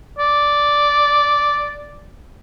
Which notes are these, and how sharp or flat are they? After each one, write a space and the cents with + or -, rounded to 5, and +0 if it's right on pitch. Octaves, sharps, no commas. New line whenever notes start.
D5 -5